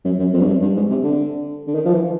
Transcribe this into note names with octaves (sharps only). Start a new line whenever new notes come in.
F#2
F#2
F2
G2
F#2
G2
G#2
C3
D3
D3
D#3
F3
E3